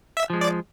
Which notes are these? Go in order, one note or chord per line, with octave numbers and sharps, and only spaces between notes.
E5
F3 G#3
D5